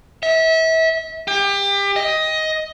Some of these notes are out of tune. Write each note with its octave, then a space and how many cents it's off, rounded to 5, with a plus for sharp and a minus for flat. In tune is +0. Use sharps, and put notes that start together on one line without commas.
E5 -30
G4 +30
D#5 +15